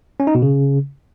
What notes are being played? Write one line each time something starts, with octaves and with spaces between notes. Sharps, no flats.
C#4
D#4
B2
C#3